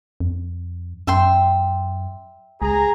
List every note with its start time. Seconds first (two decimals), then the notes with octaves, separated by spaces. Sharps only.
0.20 F2
1.07 F#2 E5 G5 C6
2.62 C#2 G#4 A#5